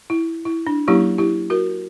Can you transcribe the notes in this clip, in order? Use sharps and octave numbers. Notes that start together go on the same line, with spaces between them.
E4
E4
D4
F#3 A#3 C#4 E4 G4
E4 G4
F#4 A#4